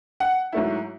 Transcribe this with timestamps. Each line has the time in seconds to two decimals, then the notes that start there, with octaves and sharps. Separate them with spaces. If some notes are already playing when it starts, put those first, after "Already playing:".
0.20 F#5
0.52 G#2 F#3 A3 E4